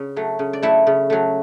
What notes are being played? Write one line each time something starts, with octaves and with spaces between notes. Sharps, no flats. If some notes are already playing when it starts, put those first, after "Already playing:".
Already playing: C#3 C#4
F#3 A3
C#3
D5
F#3 A3 E4 E5
C#3
F#3 A3